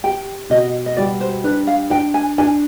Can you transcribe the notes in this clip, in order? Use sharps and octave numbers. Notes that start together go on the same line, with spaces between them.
G4 G5
B2 D#5
D#5
G3 D5
C5
D4 B4
F5
D4 G5
G#5
D4 G#5